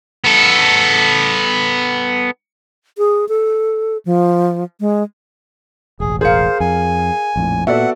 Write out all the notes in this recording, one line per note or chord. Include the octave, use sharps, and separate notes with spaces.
B3 A4
G#4
A4
F3
G#3
E1 A1 G#4
G#4 A#4 C5 F5 C#7
F2 G#5
A#1 F2 A2
A#2 B3 F#4 A4 D5 E5 F#5